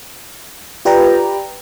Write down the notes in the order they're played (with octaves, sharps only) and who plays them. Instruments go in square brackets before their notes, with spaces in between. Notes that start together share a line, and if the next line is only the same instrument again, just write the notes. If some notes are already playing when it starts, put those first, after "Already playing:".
[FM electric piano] F4 G4 B4 D5 G5 A#5